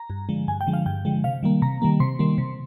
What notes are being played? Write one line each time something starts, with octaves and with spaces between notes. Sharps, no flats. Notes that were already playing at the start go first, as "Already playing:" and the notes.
Already playing: A#5
G2
D3 F3 G#3
G2 G#5
G5
D3 F3 G#3
F5
G2 G5
D3 F3 G#3
C3 F5
D#3 G3 A#3
C3 A#5
D#3 G3 A#3
C3 C6
D#3 G3 A#3
C3